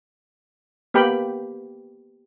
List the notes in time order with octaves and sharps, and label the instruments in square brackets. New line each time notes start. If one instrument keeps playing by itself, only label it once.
[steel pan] A#3 B3 G4 G5 B5